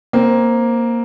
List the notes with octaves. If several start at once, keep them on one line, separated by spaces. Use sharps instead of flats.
A#3 C4